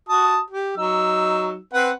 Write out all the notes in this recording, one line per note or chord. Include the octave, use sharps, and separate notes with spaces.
F#4 A5 D#6
G4
F#3 D#4 E6
C4 B4 F#5